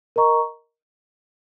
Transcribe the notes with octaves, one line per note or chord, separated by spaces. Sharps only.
A#4 D#5 A#5 C#6